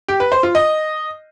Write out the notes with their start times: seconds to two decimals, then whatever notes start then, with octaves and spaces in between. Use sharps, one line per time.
0.08 G4
0.20 B4
0.32 C5
0.43 F4
0.55 D#5